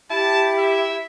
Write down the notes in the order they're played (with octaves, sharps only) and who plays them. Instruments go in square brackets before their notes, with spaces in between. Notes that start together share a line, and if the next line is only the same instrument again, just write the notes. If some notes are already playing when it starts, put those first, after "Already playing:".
[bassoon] E4 [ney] G4 [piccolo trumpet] A5
[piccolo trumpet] E5